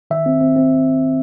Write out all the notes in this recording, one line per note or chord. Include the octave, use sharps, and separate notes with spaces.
D#3 E5
C4
C4
C4